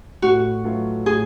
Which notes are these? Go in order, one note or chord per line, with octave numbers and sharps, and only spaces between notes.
A2 F#4
F#3 A3 F4 B4
A2 G#4